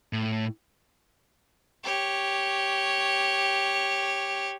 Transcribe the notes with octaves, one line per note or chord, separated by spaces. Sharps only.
A2
G4 C#5